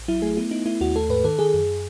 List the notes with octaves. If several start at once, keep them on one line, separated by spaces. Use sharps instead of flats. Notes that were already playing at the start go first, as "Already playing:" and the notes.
Already playing: A1
F#3 E4
A3 G#4
B3 E4
B3 D#4
A3 E4
D#2 F#4
A3 A4
G#2 B4
D#3 A4
D#3 G#4
F#2